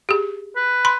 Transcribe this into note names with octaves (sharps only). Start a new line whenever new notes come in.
G4 G#4
B4
B5 C6